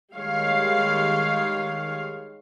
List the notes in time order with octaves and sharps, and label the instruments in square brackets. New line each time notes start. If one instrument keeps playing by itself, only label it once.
[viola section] D#3 G3 G#3 C#5 F5